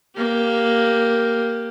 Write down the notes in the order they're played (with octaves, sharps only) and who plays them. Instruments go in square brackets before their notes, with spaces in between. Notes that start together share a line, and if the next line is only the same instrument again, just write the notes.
[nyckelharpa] A#3 G4